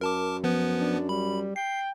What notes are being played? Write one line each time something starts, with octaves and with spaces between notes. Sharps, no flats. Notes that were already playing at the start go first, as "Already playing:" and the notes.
F#2 A#4 A5 D6
F3 B3 B4
D4
G3 B5
G5 C7